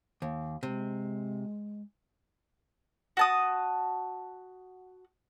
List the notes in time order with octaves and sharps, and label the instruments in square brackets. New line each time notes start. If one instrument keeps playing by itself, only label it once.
[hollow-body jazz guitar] D#2
[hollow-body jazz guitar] C3 [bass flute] G#3
[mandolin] F#4 A5 D#6